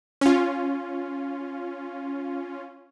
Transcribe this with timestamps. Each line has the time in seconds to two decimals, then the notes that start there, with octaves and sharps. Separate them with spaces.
0.21 C#4 F4